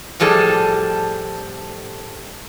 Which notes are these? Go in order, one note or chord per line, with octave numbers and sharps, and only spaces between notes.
A2 F3 G3 G#4 A4